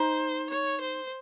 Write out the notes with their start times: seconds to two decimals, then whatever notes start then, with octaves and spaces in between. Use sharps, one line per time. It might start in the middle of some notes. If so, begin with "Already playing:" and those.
Already playing: D#4 C5
0.51 C#5
0.81 C5